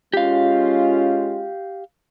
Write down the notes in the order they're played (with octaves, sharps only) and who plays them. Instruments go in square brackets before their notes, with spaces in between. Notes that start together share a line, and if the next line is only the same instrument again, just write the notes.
[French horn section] G#3 C#4 F4 [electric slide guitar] G4 F5